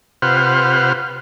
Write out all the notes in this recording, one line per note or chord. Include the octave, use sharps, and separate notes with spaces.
C3 F4 B4 C5 F#5 F6